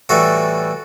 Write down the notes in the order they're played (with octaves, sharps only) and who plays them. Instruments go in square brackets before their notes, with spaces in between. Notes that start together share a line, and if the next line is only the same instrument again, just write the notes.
[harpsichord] A2 E3 G3 F#4 A4